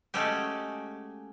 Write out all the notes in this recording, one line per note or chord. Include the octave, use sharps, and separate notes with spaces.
G#3 A3 C#4 F#4 G4